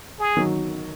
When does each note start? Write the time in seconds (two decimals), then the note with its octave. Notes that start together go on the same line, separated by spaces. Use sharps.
0.19 G#4
0.37 D#3 F#3